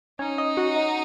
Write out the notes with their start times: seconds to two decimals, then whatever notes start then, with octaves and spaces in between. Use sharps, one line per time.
0.19 C#4 D#4
0.38 D#5
0.57 F#4
0.76 D#5